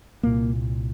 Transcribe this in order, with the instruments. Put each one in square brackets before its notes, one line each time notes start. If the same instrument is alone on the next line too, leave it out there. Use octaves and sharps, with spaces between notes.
[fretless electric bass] C2 A#2 A#3